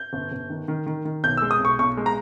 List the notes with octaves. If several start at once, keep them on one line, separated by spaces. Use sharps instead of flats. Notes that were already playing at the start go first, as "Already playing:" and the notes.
Already playing: G6
G1
G1
D#3
D#3
D#3
D#3
B1 G6
E6
G#3
D#6
B1 C#6
B1 C#6
G#3
A#5